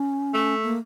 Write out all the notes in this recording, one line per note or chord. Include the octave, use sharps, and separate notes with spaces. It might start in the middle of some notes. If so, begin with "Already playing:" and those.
Already playing: C#4
A3
A#3